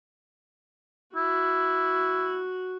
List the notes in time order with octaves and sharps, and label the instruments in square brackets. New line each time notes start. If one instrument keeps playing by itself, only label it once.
[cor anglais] E4 [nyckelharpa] F#4